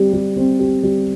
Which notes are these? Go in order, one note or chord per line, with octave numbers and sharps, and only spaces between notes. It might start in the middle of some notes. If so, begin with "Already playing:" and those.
Already playing: G3 C4 G4
G3
C4
G4
G3